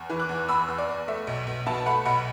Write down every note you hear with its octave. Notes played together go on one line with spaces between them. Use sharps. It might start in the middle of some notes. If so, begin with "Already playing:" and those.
Already playing: E2
E3
D6 F#6
E2
E2 B5 E6
E2
D5
E2
A3 E5
B1
B1
B2 E5 A5
A3 F#5 B5
B1 F#5 B5